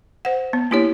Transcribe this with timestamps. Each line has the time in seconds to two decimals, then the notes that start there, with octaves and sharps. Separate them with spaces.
0.25 C5 F#5
0.53 B3
0.71 A#3 D4 E4 G4 C#5